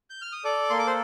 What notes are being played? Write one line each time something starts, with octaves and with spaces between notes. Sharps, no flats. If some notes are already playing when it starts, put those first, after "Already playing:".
G6
F6
D#6
A4 D5 D6
A#3 C6
D6
C5 C6